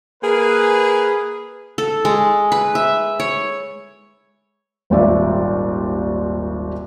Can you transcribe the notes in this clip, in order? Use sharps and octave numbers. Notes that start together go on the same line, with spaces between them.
A#3 G#4 B4
A4
G#3
B4
E5
C#5
D#1 G#1 D#2 D5 E5